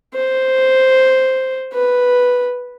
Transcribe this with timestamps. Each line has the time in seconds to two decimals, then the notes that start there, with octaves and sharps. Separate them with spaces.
0.14 C5
1.73 B4